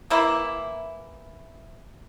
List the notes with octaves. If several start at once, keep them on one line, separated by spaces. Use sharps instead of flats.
E3 A#3 E4